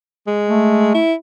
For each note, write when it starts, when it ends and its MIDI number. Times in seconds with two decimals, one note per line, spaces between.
0.27 0.92 56
0.49 1.00 57
0.95 1.14 64